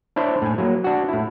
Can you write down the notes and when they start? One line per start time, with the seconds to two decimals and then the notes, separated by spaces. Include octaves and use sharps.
0.16 D4 E4 C5 C#5
0.42 A2 G#5
0.58 F#3 A#3
0.84 D4 F#4
1.09 A2 E4